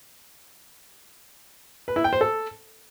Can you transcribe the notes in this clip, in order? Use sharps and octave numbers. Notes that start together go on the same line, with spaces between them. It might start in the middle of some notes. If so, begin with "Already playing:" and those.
B4
E4
G5
C5
A4